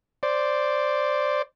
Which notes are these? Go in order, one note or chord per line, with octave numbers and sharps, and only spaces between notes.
C5 D5